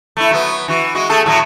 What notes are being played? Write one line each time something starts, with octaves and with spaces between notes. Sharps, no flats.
A3 E4
F#3 B3
E3 F#4
G#3 F#4
A3 G#4 A4
A2 F#3 A3